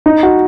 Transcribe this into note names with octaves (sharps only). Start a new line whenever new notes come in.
D#4
F#4